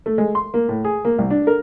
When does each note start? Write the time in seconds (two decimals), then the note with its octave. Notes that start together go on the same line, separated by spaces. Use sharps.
0.06 A3
0.18 G#3
0.35 C6
0.54 A#3
0.69 A2
0.84 G#4
1.05 A#3
1.18 C2
1.30 D4
1.47 A#4